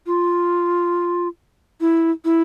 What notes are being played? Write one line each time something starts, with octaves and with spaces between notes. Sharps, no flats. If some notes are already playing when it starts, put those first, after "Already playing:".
F4
E4
E4